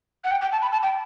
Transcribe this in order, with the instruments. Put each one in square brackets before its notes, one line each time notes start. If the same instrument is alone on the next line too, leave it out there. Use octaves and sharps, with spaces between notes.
[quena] F#5
G5
G5
A5
B5
A5
G5